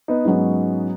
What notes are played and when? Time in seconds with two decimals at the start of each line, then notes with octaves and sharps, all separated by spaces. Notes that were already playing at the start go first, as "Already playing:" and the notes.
0.08 B3 D#4
0.25 G#2 F#3 C#4